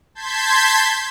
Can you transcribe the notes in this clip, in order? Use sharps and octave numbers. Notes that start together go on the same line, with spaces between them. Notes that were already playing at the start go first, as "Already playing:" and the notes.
A5 C6 G6 G#6 B6